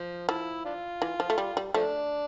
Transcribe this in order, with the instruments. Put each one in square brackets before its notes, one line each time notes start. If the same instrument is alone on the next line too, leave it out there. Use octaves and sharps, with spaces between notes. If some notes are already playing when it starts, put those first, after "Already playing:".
Already playing: [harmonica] F3
[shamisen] F3 [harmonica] E4
[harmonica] D4 F4
[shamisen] E3
F3
A3
G3
G3
[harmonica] F3 D4 [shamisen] A3